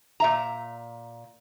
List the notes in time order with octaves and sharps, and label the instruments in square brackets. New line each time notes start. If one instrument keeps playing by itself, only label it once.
[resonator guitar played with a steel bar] A#2 E5 A#5